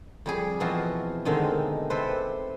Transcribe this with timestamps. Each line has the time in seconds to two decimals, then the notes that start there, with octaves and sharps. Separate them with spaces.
0.26 F2 G3 G#4
0.60 B2 E3 F3 C4 F4 F#4
1.25 B2 D3 D#3 G#3 A3 C4
1.90 C3 C4 A4 B4 C5